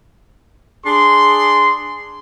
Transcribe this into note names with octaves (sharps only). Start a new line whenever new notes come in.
D4 G#4 C6